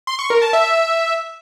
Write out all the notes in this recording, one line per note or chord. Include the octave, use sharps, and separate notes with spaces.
C6
C#6
A#4
A5
E5